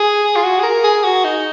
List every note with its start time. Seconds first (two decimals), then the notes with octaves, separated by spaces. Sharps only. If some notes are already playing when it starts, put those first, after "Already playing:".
Already playing: G#4
0.36 F4
0.44 F#4
0.60 G#4
0.63 A#4
0.84 G#4
1.04 F#4
1.25 D#4